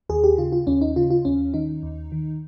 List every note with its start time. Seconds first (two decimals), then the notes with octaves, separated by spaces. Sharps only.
0.09 D#2 G#4
0.24 G4
0.38 C#3 F4
0.52 F4
0.67 D#2 C#4
0.81 D#4
0.96 C#3 F4
1.10 F4
1.25 D#2 C#4
1.54 D#3 D#4
1.83 D#2
2.12 D#3